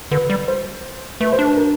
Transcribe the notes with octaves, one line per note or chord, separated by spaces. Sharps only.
D3 B4
G3
C5
A3 B4
C5
D4
B4
A#4